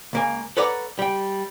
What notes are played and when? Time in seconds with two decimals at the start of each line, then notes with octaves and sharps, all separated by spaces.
0.13 C#2 A#3 G#5
0.57 A4 B4 C#5 D5 F#5 A#5
0.99 G3 G5